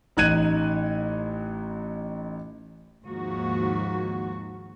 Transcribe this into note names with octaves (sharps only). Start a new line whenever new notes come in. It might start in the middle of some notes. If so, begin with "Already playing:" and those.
A1 D#4 F#6 G#6 D#7
D#2 G#2 F3 A#3 F#4